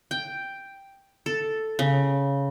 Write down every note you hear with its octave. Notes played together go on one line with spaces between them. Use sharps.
G5
A4
C#3